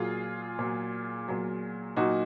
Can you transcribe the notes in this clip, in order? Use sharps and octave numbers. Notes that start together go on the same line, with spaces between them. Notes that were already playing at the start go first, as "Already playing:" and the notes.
Already playing: A#2 F#3 F4 G#4
A#2 F#3
A#2 F#3
A#2 F#3 D#4 F#4